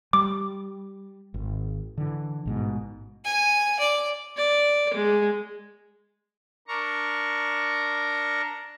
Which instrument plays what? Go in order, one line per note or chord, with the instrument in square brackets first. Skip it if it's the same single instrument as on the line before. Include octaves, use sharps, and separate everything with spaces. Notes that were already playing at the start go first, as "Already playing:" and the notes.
[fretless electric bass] G3 [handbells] D6
[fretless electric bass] G#1
D3 E3
A1 G#2 B2
[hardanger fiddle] G#5
D5
[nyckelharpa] D5
G#3
[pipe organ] D4 A#4 A#5 C#6